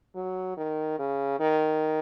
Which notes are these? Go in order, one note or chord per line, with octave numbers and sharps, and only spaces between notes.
F#3
D#3
C#3
D#3